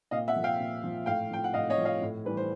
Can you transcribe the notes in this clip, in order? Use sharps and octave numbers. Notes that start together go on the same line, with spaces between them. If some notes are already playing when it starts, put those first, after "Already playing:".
A#2 D#5 F5
E5 F#5
F3
F5 G5
A#2
F3
A2 F5 G5
F3 G5
F#5
A2 D#5 F5
C#5 D#5
F3
D#5 F5
A2
E3 G3 B4
C5